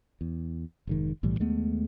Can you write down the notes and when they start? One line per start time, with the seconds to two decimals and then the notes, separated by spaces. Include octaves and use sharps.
0.21 E2
0.87 F1 G#2 D#3
1.23 B1 A2 E3 G3
1.39 D#2 G#3 A3 B3